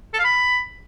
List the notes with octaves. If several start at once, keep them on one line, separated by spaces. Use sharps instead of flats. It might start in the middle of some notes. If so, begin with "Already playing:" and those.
A4
F5
B5